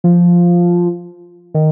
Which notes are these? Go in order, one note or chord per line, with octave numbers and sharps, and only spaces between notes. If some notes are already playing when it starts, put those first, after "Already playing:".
F3
D#3